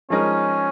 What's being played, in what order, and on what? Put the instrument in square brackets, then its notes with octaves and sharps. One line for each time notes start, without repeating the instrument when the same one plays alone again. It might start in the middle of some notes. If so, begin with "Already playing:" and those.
[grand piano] F3 G#3 D#4 A#4 [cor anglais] C#4